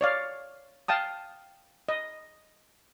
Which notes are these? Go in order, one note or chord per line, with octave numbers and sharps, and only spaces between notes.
C#5 D5 F5
F5 G5 A5 D#6
D#5